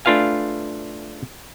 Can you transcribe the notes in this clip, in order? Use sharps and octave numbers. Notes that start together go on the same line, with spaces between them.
A3 D4 F4 B4 F5 G#5